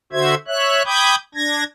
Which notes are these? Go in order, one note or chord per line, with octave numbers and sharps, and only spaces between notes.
D3 F#4 C5 E5 G#6
C#5 E5 F#6
G5 B5 D6 D#6 G6 G#6
D4 G#6 A#6